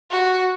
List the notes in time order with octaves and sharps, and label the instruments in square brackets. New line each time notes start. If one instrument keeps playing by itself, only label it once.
[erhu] F#4